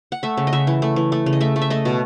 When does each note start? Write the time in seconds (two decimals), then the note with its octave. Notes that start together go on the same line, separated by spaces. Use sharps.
0.12 F#5
0.23 A3 E5
0.37 C#3
0.47 D#5
0.53 C#3 E5
0.67 E3
0.82 A3
0.96 E3
1.12 A3
1.26 C#3
1.33 D#5
1.41 A3 E5
1.56 A3
1.62 E5
1.70 A3 D#5
1.85 B2